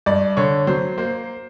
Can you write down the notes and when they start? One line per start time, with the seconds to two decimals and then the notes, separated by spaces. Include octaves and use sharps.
0.06 G2 D5
0.37 D3 C#5
0.67 F#3 C5
0.98 A#3 C5